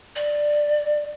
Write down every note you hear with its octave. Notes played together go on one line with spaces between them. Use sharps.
D5